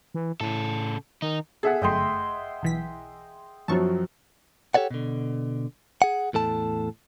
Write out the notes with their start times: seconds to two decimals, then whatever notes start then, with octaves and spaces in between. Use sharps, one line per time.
0.14 E3
0.41 A2 C#3 A4
1.22 D#3 D#4
1.63 G#4 A4 E5 F#5
1.82 G1 F#2 A3 D#5 G5 C6
2.62 B1 E3 B6
3.68 F#2 F3 F#3 A5 C#6
4.74 G4 A4 C#5 D5 F#5
4.91 B2 D3
6.02 G#4 F#5
6.33 E2 A2 A4 A5